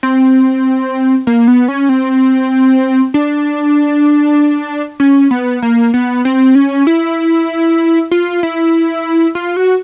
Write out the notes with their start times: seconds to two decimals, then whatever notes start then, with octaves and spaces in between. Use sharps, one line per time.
0.03 C4
1.27 A#3
1.48 B3
1.68 C#4
1.89 C4
3.14 D4
5.00 C#4
5.31 B3
5.62 A#3
5.94 B3
6.25 C4
6.55 C#4
6.87 E4
8.11 F4
8.43 E4
9.35 F4
9.57 F#4